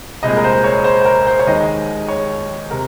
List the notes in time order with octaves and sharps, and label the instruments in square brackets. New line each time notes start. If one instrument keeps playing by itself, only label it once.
[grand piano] C2 A#2 G#3 D#5
A#4
C5
C#5
C5
C5
A#4
C5
C#5
D#2 D#3 G#3 D#5
C#5
C3 A#4